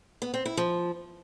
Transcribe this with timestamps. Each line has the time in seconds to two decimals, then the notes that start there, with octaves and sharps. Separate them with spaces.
0.22 B3
0.34 C4
0.45 E4
0.57 F3